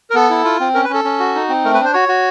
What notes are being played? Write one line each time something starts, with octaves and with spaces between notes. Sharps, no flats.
A#4
B3 A4
E4
F4
C4
C#4 A#4
B4
C#4 A4
C#4
F#4
D#4
C4
A3 A#4
B4
D4
C5
F#4 C#5
F#4